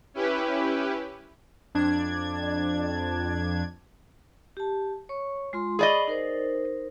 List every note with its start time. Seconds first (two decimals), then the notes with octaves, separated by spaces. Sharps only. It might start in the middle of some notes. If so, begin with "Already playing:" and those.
0.14 C#4 E4 G4 B4
1.75 F2 D4 G#6
4.57 G4 A5
5.09 C#5 C#6
5.53 G#3 F4 C6
5.79 G#4 D5 D#5 B5 C#6
6.08 D#4 A#4 C5